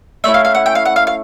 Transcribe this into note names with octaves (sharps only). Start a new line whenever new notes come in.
A3 C#4 E4 E5
F5
F5
F#5
G5
F5
F#5
F5
F5